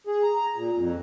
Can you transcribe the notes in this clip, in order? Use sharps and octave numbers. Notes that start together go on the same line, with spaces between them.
G#4
A#5
A#2
F2